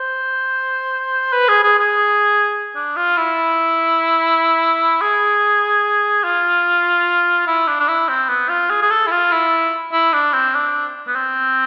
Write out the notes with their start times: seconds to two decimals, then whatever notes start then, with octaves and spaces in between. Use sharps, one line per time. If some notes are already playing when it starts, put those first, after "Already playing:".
Already playing: C5
1.33 B4
1.49 G#4
1.64 G#4
1.79 G#4
2.76 D4
2.97 F4
3.17 E4
5.02 G#4
6.24 F4
7.47 E4
7.68 D4
7.80 D4
7.88 E4
8.09 C4
8.29 B3
8.49 F4
8.70 G#4
8.82 G#4
8.90 A4
9.07 E4
9.11 F4
9.32 E4
9.93 E4
10.13 D4
10.34 C4
10.55 D4
11.07 B3
11.16 C4